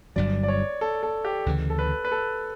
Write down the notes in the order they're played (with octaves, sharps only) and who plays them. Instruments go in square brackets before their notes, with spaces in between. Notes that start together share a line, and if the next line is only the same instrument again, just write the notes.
[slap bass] G1 G2 F#3 [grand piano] D5
[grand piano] D5
C#5
A4
A4
G4
[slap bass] D2 C#3 E3
[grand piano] A4
B4
B4
A4